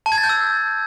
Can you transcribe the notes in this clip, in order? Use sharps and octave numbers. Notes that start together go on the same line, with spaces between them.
A5
G#6
A6
G6
E6